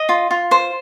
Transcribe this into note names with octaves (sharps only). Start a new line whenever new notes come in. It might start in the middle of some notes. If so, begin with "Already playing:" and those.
Already playing: D#5
F4
F4
C5